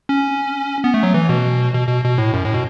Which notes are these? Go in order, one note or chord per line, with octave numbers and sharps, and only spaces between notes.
C#4
B3
A3
F#3
E3
B2
B2
B2
B2
A2
F#2
A2
B2